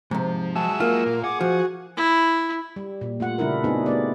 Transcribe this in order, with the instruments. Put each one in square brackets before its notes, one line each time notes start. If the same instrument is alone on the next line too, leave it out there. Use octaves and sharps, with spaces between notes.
[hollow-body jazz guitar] G#2 C3 [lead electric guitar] F3
[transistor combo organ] F#3 G#3 E5 [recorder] A5
[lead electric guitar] A#3 [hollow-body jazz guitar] F4 [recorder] A#4
[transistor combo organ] A#2
[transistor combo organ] G#4 [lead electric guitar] F#5 [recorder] D6
[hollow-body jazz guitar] F3 [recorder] F#4
[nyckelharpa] E4
[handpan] G3
A#2
A3 F4 F#5
C#3 G3 D4 E4 A#4
A3 B3 C4 D#4 F#4 G#4
A3 B3 D5